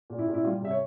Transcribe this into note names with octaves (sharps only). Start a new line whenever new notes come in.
A#2
E4
A#2
E4
G3 F4
C3 E5
C#5